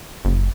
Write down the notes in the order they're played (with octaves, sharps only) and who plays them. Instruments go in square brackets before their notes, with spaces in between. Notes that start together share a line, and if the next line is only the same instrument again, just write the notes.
[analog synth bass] F#1